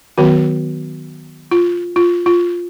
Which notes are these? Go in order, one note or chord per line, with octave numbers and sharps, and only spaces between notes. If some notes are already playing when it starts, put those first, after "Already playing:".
D#3 F#3 B3 F#4
F4
F4
F4